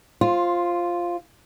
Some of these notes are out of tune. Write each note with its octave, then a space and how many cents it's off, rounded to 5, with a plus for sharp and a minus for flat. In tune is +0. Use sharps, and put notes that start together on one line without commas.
F4 +0 C5 +20